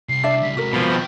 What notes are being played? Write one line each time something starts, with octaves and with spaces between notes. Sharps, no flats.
C2 C7
D4 D5 E5
C#2 G3 B6
C3 G#3 F#4 A#4
B2 F3
A#4 G5